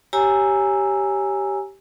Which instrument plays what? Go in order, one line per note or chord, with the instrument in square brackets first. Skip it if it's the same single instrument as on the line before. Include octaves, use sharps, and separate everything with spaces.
[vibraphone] G4 C#5 G#5 A#5 E6